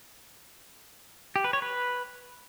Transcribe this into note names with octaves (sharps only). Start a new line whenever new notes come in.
G4
B4
C#5
B4